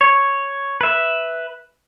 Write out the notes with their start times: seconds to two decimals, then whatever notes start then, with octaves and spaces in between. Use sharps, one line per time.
0.01 C#5
0.81 B4 E5